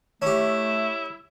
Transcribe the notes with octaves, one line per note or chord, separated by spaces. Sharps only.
A3 C#4 E4 G4